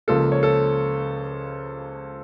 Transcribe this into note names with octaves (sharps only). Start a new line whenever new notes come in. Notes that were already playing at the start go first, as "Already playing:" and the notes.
C#2 C#3 F3 A#3 A4
C#5
A4